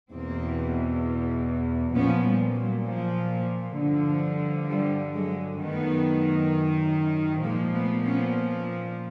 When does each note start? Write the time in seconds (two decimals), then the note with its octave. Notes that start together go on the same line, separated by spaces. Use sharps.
0.11 E2 B2 A#3 C4
1.95 A#2 F3 B3 C#4
2.25 F3 G3
2.55 F#3
2.86 F3
3.78 G2 D3 F3
4.69 F3 G3
5.15 F#3 G#3
5.60 F#2 D#3 A3 B3
7.43 A#2 F3 G#3 A#3
7.75 A3 B3
8.05 B3 C#4